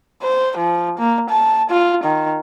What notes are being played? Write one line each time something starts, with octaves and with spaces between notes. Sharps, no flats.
C5
F3
A#3
A5
F4
D#3